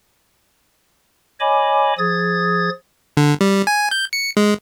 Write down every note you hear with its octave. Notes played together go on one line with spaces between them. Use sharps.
C#5 D#5 G#5 B5 D6
F3 G#4 D#6 G#6 A6
D3
G3
G#5
G6
C#7
G#3